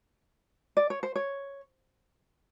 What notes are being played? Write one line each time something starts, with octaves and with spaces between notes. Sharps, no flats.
D5
C#5
C5
C#5